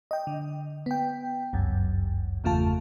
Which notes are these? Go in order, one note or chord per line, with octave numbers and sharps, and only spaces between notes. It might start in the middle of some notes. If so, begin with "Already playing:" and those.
D#5 G5
D3
B3 G5
G1 C#2 F#2
G1 E2 C#3 A3 F4 A5